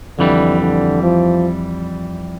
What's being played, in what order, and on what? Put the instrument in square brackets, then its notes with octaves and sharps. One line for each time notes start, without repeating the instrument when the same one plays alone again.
[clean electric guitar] F2 E3 G3 [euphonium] D3
[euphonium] D3
F3